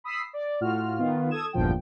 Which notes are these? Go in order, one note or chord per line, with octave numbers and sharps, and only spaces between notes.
B5 D#6 E6 B6 C7
D5
A2 F4 F#4 F6
D#3 B3 F4
A4 D#6 G#6 E7
G1 E2 G2 A#2 F3 G5